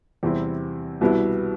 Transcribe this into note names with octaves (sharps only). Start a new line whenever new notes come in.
E2 C3 G3 C4 E4
C2 B2 G3 B3 E4